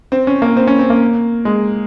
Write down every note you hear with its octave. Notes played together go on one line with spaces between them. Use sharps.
C4
C#4
A#3
C4
C#4
C4
A#3
G#3